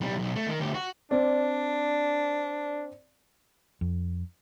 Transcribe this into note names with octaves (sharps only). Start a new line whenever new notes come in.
B1 G3
B1
A3
D#3
D2 G4
F#4
C4 D4 D5
F2